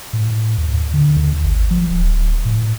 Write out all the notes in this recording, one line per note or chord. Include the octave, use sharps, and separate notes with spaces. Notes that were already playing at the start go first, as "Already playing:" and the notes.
A2
D#2
D#2
D3
D#2
G#1
F3
D1
A2